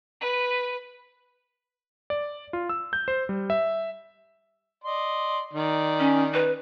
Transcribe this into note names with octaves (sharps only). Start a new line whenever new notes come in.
B4
D5
F4
E6
G6
C5
G3
E5
D5 D#5 C6
D#3 D#4 D5
C#4
B4